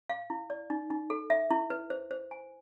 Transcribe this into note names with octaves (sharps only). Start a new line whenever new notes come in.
F5
E4
D5
D#4
D#4
A4
E5
E4
B4
C5
C5
G#5